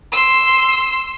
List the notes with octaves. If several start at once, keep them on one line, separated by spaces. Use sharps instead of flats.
C6 E6